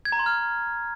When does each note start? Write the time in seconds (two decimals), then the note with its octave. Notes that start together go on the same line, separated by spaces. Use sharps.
0.05 G#6
0.12 A#5
0.19 C6
0.26 F6